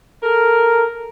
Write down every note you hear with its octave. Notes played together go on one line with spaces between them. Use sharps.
A4 A#4